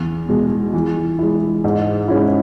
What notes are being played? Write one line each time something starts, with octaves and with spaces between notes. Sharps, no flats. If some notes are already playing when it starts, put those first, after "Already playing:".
Already playing: E2
B2 G#3
E3
G#3 E4
G#2
G#3 C#4 E4